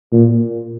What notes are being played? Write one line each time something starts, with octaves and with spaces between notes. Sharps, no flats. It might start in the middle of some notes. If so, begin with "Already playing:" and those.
A#2